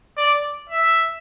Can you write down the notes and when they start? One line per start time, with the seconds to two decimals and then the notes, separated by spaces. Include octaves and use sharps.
0.17 D5
0.70 E5